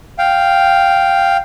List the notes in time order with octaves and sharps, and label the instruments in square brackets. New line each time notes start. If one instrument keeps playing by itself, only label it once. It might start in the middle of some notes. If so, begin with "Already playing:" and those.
[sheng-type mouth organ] F5 G5